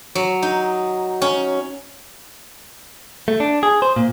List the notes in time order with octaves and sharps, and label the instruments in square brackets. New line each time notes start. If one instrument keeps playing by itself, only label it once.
[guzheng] F#3
D#4
C#4
[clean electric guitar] A3
D4
G#4
C5
A#2